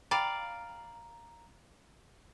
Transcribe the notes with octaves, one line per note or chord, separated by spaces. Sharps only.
D5 F5 G5 A#5 B5